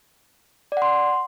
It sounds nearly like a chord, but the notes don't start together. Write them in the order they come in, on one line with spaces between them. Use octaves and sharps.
D5 F#5 C6